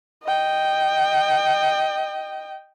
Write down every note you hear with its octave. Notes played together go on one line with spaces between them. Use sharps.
D#5 G5